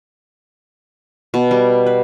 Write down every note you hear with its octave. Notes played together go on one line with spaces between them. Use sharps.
B2
G3
B4